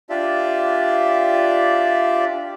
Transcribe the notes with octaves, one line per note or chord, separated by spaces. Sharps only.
D4 F4 G4 D5 E5